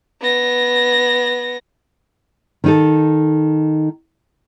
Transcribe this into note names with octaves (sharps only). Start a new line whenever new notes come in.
B3 A#6
D#3 D#4 A4